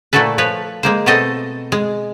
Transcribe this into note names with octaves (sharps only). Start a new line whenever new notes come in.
A#2 A3 E4 F#4 A4 B4
F3 B4 C#5
G#3 A#3 C5
B2 A3 C4 A4 D#5
G#3